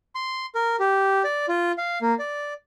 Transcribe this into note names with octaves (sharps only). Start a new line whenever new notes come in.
C6
A#4
G4
D5
F4
F5
A#3
D5